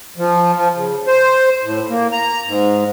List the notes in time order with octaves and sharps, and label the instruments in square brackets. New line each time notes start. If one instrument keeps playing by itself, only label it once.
[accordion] F3
F3
C#3
C5
A2
A#3
A#5
G#2